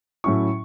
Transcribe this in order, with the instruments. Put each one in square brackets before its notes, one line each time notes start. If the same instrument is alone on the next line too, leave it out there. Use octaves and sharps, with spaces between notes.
[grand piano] A2 F#3 C#4 E4 C#6